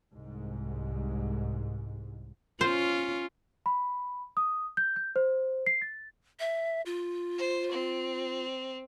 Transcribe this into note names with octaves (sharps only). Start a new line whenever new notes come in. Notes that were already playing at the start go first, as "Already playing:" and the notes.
C2 G#2
C#4 F4 C5
B5
D#6
G6
G6
C5
C7
A6
E5
F4
C5
C4